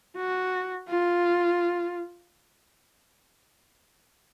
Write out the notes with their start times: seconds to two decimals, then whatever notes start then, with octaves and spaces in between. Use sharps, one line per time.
0.16 F#4
0.89 F4